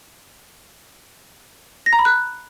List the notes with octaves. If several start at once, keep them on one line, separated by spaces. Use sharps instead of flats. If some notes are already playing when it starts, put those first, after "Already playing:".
A#6
A#5
B5
F#6